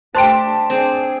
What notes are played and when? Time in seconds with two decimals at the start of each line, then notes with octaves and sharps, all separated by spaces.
0.15 A3 D4 G4 C5 G5 A5 C6 D7
0.70 C4 D4 G#4